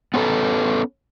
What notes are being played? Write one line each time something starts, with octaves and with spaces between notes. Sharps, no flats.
B3 C#4 G#4 A4 B4